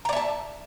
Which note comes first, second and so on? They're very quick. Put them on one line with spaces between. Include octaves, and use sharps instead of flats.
A#5 D5 E5 A5